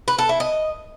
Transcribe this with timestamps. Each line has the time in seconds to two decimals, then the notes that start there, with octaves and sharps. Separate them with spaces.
0.08 B4
0.18 A4
0.29 E4
0.40 D#5